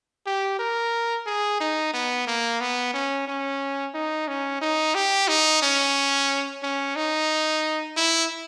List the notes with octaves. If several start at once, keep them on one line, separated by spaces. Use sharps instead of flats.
G4
A#4
G#4
D#4
B3
A#3
B3
C#4
C#4
D#4
C#4
D#4
G4
D#4
C#4
C#4
D#4
E4